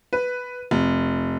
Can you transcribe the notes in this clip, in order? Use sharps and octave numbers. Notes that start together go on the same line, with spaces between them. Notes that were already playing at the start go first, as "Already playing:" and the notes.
B4
F1